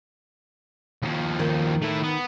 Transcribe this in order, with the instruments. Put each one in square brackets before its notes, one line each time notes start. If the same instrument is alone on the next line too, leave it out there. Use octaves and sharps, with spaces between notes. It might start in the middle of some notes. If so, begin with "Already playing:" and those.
[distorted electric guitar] D#2 F3
[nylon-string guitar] D#3
[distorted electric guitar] A3 E4
B3